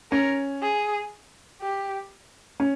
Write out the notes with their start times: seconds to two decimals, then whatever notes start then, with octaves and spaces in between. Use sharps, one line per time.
0.11 C#4 A#4
0.62 G#4
1.61 G4
2.60 C#4